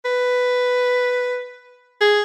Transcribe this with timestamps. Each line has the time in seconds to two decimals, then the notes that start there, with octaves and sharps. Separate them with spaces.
0.05 B4
2.01 G#4